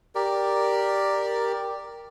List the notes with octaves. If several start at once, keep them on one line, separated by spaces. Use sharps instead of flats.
G4 A#4 D5